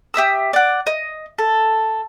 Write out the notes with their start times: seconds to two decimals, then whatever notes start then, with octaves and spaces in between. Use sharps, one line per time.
0.14 G4 E5 D#6 E6
0.53 D5 F#5
0.87 D#5
1.38 A4